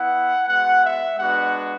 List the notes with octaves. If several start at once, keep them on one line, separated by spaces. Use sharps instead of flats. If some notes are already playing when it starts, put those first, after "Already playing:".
Already playing: B3 E4 F#5
G#3 B3 F#4 F#5
E5
G#3 B3 D4 F#4 F#5